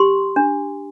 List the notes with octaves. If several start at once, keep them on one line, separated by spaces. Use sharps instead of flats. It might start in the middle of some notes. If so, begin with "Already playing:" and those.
Already playing: G4 C6
D4